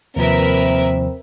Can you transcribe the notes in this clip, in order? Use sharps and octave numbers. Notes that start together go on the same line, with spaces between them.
D#2 C3 F3 C4 A#4 B4 E5